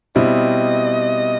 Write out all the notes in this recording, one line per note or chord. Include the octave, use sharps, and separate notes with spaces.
B2 G3 C4 E4 D#5